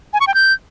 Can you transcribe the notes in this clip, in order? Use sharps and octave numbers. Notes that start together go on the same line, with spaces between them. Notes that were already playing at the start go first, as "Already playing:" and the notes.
G#5
C#6
G5
G6